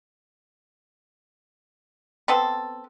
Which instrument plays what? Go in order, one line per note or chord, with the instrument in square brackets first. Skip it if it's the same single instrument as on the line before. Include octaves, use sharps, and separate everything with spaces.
[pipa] B3 C4 A4